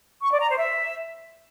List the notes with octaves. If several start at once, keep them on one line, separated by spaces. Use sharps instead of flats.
C#6
D5
A#5
C5
E5